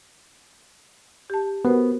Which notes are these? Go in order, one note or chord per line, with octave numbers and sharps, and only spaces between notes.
G4 A5
B3 F#4 A#4 C5